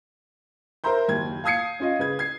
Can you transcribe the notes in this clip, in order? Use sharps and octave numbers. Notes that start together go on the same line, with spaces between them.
A#4 C5 E5 A#5 C6 G6
F#1 D#2 G#6
F5 A5 D#6 G#6 C7 C#7
C#4 F4 D#5
C#3 B4 G#6
G#6 C7